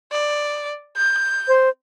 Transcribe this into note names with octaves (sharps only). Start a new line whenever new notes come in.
D5
G6
C5